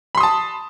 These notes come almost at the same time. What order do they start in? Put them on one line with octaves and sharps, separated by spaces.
B5 C6 D#6 A5